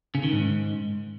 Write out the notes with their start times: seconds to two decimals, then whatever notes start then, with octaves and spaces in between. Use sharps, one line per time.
0.15 C#3
0.23 D#3
0.32 G#2